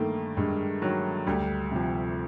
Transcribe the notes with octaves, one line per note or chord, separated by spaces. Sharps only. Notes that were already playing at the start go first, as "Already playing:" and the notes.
Already playing: G2 D#3 A3 A#3
G2 G#3
D#3 F#3
D2 G3
C3 F3